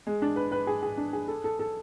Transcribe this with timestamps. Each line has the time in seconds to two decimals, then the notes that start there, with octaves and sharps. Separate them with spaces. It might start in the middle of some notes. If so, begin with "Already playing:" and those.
0.07 G#3
0.22 D4
0.36 B4
0.52 B4
0.67 G#4
0.83 G#4
0.98 D4
1.13 G#4
1.28 A4
1.44 A4
1.59 A4